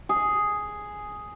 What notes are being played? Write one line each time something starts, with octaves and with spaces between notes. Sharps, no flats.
G#4